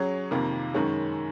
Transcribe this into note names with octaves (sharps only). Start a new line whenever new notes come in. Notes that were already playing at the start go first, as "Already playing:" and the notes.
Already playing: F#3 C#4 G#4 C#5
F2 C3 D#3 A#3 F4
F#2 D#3 G#3 C#4